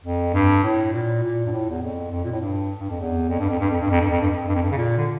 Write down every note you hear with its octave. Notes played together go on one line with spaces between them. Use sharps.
F2
G2
A2
A#2
A#2
G2
A2
E2
F2
F2
A#2
A2
G2
G2
F2
E2
F2
G2
F2
G2
F2
G2
F2
G2
F2
G2
F2
G2
F2
G2
C#3
A#2
D3